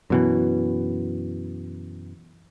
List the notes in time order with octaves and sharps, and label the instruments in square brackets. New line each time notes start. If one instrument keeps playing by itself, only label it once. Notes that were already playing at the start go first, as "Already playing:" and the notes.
[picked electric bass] F#2 B2 E3